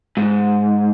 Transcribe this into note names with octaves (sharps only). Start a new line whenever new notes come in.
G#2